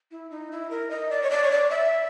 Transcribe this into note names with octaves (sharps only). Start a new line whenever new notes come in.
E4
D#4
E4
A#4
D#5
D5
C#5
D5
C#5
D5
E5